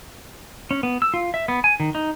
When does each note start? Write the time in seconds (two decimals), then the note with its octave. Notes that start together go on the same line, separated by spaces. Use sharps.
0.71 C#4
0.83 B3
1.02 E6
1.14 F4
1.34 E5
1.48 B3
1.64 G#5
1.80 D#3
1.95 D#4